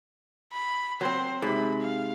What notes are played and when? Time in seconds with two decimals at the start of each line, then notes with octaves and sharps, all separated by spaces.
0.53 B5
1.01 F#3 C4 C5
1.42 G#2 C3 B5
1.81 F5